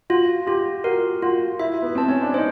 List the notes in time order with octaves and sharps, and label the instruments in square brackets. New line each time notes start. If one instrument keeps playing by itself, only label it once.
[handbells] F4 [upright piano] F#4
[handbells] F4 [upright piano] G4
[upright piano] F#4 [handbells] A#4
[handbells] F4 [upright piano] F#4
[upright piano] E4 [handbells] E5
[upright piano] B3
[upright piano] C4 [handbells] A5
[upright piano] C#4
D4
[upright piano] D#4 [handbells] C5